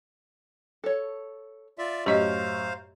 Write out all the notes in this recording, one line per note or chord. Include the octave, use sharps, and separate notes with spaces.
A4 C#5
F4 D5 E5
F#2 A2 C#4 G4 C5 D#5 F5